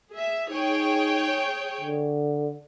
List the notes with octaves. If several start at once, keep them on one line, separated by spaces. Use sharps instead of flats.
G#4 E5
D#4 G#4 C#5 G5
D3